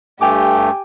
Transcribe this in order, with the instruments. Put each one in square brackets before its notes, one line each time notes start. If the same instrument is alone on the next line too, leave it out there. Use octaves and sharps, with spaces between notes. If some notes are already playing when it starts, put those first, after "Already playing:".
[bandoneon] G2 A3 [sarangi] G4 [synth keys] G5 G#5 D6